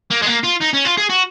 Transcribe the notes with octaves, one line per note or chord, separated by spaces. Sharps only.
A#3
G#3
A#3
F4
D#4
C#4
F4
G#4
F#4